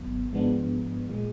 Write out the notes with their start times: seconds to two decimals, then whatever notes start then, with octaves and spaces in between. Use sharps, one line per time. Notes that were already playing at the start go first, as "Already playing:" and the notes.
Already playing: G#1 G#2 F#3 B3
0.32 G#2 F3 G#3 B3 D4
1.09 A#2 G#3